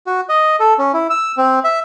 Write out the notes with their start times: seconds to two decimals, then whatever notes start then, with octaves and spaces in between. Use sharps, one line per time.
0.07 F#4
0.29 D#5
0.60 A4
0.79 C#4
0.94 E4
1.10 E6
1.37 C4
1.64 E5